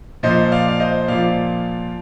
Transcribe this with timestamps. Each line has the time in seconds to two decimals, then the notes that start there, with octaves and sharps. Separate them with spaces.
0.23 A#2 F3 C5 D#5
0.52 D5 F5
0.68 F5
0.80 C5 D#5
1.08 A#2 F3 D5 F5